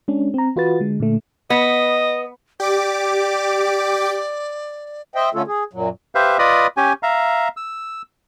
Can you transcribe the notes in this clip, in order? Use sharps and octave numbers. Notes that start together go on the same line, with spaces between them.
G#3 C#4 D4
C4 A#5
E3 F4 F#4 B4 A6
D3 G#3
A#2 D3 A3
B3 D#5
G4 D5 D6
C5 D#5 E5 G5
D3 A3 C#4 F4 A4
G#4
F#2 A#2 F#3
G4 B4 C5 E5 F5
F4 B4 D5 D#5 B5 D#6
C#4 G4 G#5
E5 F5 A#5
E6